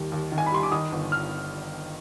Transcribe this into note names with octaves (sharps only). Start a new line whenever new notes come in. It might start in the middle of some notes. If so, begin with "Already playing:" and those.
Already playing: D#2 D#3 G3
D#2
D#3
G#5
B5
G3 C6
D6
D#3 D#6
G1
F6